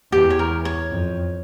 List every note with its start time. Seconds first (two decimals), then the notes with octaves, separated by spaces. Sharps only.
0.12 E2 G4
0.30 C#5
0.39 A#4
0.65 C#5
0.91 F2